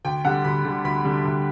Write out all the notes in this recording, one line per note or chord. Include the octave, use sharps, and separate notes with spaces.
D2 G5
D3 G3 F#5
D2 B5
D3 G3
D2 B5
D3 G3
D2